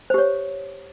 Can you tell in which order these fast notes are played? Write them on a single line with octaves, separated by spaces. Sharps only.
C5 G4 C#5